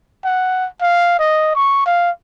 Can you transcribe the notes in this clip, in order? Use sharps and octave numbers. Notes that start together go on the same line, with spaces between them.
F#5
F5
D#5
C#6
F5